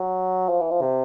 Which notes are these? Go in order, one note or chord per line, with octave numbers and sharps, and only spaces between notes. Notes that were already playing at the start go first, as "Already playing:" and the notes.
Already playing: F#3
F3
E3
F3
C3